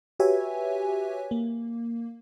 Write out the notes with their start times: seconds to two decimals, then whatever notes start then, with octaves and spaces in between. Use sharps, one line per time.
0.20 F#4 G4 B4 C#5 E5 G#5
1.31 A#3